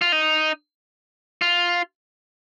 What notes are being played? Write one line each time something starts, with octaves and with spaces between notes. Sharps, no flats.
F4
D#4
F4